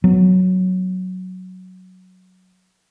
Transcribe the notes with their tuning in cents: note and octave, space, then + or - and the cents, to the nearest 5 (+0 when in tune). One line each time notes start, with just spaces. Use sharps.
F#3 +0 B3 +0